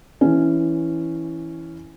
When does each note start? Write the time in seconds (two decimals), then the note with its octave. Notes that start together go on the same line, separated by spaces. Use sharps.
0.21 E3 C#4